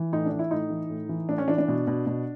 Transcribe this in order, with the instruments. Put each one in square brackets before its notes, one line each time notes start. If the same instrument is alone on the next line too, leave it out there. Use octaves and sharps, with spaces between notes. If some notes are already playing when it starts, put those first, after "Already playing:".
Already playing: [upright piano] E3
A2 D#4
D4
E3
E4
A2 D#4
E3
A2
E3
A2 D4
C#4
E3 D4
D4
B2
B2
B2